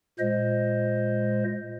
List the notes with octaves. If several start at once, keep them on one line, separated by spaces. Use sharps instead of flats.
A#2 G#3 C5 D#5